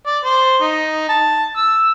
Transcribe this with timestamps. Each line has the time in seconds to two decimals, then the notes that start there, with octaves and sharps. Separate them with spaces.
0.07 D5
0.24 C5
0.62 D#4
1.09 A5
1.56 E6